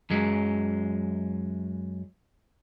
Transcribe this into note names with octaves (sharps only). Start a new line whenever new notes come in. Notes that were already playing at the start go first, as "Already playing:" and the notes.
F#2 F#3 G#3